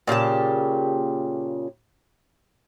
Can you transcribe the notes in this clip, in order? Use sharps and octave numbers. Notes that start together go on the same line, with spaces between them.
A#2 C#3 G4 A5